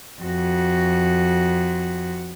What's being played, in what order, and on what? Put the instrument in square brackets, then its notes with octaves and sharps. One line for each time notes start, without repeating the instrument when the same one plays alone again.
[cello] F2 F#4